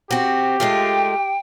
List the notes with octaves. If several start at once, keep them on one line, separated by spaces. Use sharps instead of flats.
C4 F#4 G4
G#3 A3 F4 G5